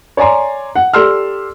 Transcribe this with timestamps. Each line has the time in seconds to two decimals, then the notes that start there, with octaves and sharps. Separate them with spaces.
0.17 C#5 D5 G#5 A#5 C6
0.76 F#5
0.93 G4 A4 D5 C6 E6 F6